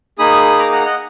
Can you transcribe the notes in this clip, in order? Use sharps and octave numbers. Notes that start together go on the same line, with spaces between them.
A#3 D#4 G#4 B5 D#6
A#5 D6
F#5 A#5
D#5 F#5